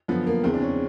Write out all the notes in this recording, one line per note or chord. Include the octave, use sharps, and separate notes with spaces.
F#2 D3 F3 B3
A#3
E2 C#3 E3 C4
D4
C#4